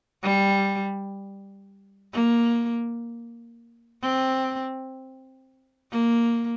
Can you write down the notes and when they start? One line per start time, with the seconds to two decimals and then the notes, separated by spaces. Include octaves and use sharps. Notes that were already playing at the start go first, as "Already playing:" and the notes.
0.23 G3
2.13 A#3
4.03 C4
5.92 A#3